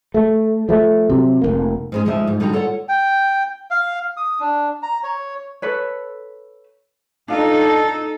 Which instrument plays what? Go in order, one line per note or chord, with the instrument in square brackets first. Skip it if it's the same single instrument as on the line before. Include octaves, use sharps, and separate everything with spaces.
[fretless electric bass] A3
F3 A3
C3 F#3
F1 F#2 A#3
[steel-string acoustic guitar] G#2 G#3 C#4
D2 F3 G#3 D#4 E5
G#2
D3 G3 D#4 F#4 A#5
F4 A4 C#5 D5 F#5
[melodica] G5
F5
D#6
D4
A#5
C#5
[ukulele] A4 B4 C#5
[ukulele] D4 F4 [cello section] D#4 A4